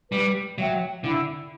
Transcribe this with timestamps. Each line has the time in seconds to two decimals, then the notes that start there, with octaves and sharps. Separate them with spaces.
0.12 G3 B4
0.58 F#3 E5 G5
1.04 D3 E4